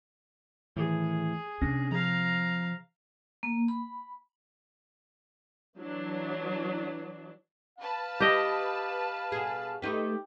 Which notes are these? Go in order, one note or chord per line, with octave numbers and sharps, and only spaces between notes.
A2 D#3 E3 G#4
C3 C#4 D4 A#6
F3 F5 A#5
A#3
B5
E3 F#3 D4
B4 F5 A5
G4 D#5
B2 G#4
A3 D#4 G4 B4